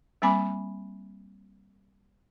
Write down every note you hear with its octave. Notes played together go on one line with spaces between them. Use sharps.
G3 A#3 C4 G#5 B5 D6